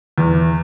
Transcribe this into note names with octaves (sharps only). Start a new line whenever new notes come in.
E2